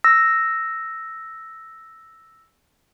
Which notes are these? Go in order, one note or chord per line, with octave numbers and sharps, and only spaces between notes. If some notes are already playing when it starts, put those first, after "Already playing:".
E6 A#6